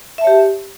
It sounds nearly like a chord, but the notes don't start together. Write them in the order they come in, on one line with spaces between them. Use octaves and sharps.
E5 A5 C#5 G4